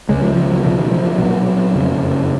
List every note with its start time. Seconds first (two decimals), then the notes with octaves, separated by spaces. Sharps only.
0.09 C#2 C#3 G#3
0.23 F3
0.35 F3
0.50 F#3
0.63 B1 B2 F3
0.78 D#3
0.92 F3
1.05 F3
1.18 B1 A#2 F#3
1.74 F#1 F2 C#3